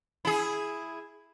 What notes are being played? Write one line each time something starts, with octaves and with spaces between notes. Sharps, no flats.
E4 G#4